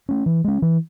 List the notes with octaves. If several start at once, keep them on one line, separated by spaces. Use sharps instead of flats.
A3 C#4
E3
G#3 C#4
E3